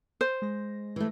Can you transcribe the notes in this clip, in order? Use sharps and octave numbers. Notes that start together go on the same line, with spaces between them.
C5
G#3 A#6
E3 A3